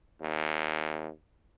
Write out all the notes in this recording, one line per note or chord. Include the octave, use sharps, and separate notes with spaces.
D#2